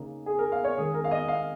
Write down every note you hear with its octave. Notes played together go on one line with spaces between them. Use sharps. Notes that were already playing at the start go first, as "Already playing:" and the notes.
Already playing: C#3 A#3 D#4
G#4
A#4
F5
C#5
D#3 G#3 C#4 G#4
A#4
F5
D#5
F5